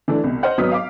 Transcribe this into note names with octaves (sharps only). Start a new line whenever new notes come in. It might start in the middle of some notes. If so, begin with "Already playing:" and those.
E3 A3 D4
C2 B2
C5 D#5 F#5 F6
G#1 F#3 B3 D#6 B6
F5 D6